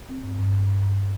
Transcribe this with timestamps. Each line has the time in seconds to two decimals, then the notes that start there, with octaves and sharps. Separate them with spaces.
0.09 C4
0.24 G2
0.39 G2
0.53 G2
0.67 G2
0.83 G2